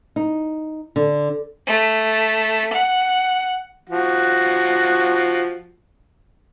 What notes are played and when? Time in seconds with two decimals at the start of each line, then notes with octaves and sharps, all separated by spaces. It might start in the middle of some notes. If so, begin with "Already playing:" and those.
0.16 D#4
0.96 D3
1.66 A3
2.72 F#5
3.89 F3 F#4